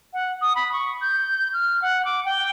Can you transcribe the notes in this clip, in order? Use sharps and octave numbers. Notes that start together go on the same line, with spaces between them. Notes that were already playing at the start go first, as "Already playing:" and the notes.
F#5
D#6
B5
C#6
G6
F6
F#5
D6
G5